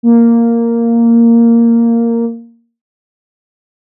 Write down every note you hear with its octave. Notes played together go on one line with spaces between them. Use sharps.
A#3